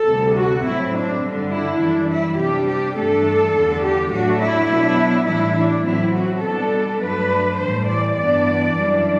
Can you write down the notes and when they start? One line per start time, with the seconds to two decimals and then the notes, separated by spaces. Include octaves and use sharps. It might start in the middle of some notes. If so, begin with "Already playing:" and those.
Already playing: A4
0.08 D2 C3 G3
0.37 F#4
0.66 A2 F#3 C4 E4
0.94 D4
1.23 G2 D3 G3 D4
1.52 E4
1.81 F#2 E3 G3 D4
2.10 E4
2.39 C3 G3 D4 G4
2.68 G4
2.97 G2 E3 A3 D4 A4
3.54 E2 D3 G3 D4
3.83 G4
4.12 A2 F#3 A3 D4 F#4
4.41 E4
4.70 B2 F#3 B3 D4
5.27 A2 E3 G3 D4 E4
5.57 D4
5.85 A2 F#3 C4 E4
6.14 F#4
6.44 B2 G3 B3 D4 A4
7.01 G2 F#3 A3 D4 B4
7.59 A2 E3 G3 C5
7.88 D5
8.17 G2 E3 B3 D4 D5
8.75 F#2 E3 G3 D4